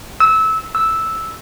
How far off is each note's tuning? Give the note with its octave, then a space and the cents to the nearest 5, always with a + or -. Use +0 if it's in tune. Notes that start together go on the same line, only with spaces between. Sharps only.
E6 -20
E6 -5